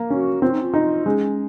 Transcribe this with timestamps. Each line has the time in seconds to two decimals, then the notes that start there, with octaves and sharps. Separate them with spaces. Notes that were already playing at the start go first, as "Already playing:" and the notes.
Already playing: A#3
0.10 C#4 F#4
0.42 C4 F4
0.52 D#4
0.62 F4
0.74 D#4
1.06 G#3 C#4